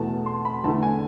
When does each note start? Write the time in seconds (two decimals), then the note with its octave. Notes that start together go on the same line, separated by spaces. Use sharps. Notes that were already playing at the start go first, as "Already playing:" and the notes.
Already playing: E2 B2 A3 A5
0.26 C6
0.45 B5
0.64 E2 D3 A3 A5
0.83 G#5